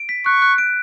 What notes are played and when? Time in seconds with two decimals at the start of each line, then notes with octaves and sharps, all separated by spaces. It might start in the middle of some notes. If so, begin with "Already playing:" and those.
Already playing: D7
0.09 B6
0.26 C#6 F#6
0.42 F#6
0.58 D7